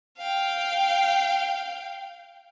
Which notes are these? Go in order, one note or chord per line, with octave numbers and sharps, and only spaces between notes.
F5 G5